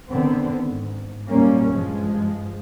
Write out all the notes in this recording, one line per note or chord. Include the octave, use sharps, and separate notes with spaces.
D3 D#3 B3 C4
G#2
F#2 A#2 G3 A#3 C#4
G2 F3 G#3